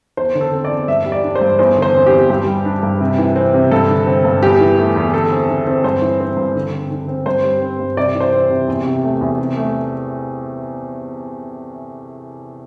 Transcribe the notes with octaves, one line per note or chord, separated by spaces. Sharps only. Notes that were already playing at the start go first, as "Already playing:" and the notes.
E2 C5
D3
A4
C4
D5
E2
G2 E5
G3
D5
D4
C5
G2
E2 C5
D3
C5
C4
G4
E2
G2 G4
G3
D4
G2
C3
E3
C4
C3
G2 A4
D3
C4
G2
E2 G4
E3
A3
E2
D3 A4
C4
D3
C4
G2 C5
E3
C4
G2
D3
C4
D3
C4
G2 C5
G3
C4
G2
C3 D5
E3
C5
C4
C3
E2
C3
A3
E2
C3
A3